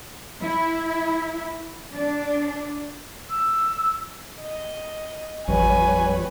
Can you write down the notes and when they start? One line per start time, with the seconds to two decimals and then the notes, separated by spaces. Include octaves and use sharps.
0.42 E4
1.95 D4
3.30 E6
4.41 D#5
5.48 A1 F2 G3 B4 C#5 G#5